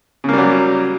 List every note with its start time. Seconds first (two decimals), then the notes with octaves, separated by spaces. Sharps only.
0.24 C#3
0.29 A#3
0.33 G3
0.38 F#3